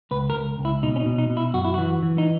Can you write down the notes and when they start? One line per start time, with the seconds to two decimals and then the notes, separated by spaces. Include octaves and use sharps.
0.11 C#2 B4
0.30 A#4
0.36 C#2
0.59 C#2
0.65 E4
0.83 B2 D#4
0.96 C#4
1.00 D#4
1.06 B2
1.18 D#4
1.30 B2
1.37 E4
1.54 F#2 F#4
1.65 E4
1.74 E3 F#4
2.03 E3
2.18 D#4